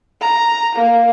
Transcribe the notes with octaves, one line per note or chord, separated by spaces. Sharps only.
A#5
A#3